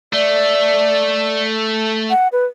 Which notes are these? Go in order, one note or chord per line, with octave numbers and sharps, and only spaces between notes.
A3 D5
F#5
B4